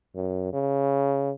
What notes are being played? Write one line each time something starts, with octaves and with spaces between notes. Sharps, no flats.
F#2
C#3